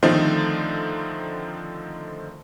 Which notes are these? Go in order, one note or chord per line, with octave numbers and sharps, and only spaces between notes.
D3 D#3 F3 A3 C4 D#4